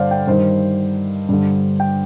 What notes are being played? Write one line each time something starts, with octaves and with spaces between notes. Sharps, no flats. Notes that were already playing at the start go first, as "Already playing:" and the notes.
Already playing: G2 D3 C5 D5 F5
G5
G2 D#3 C5
G2 D3
G5